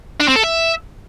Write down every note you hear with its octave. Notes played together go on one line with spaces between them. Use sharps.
D4
C4
A4
E5